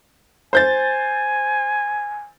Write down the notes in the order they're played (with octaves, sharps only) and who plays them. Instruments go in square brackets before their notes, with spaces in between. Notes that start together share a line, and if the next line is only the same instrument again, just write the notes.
[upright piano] C5 G6 A6 [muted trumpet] G#5